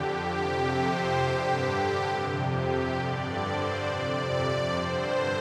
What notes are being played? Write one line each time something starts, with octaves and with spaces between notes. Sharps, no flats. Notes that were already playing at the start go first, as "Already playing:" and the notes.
Already playing: F2 D3 G4
F2 C3 G4
C5
G2 D3 G4
G4
F2 C3
G4
G2 D3 D5
C5
F2 C3 D5
D5
G2 D3 C5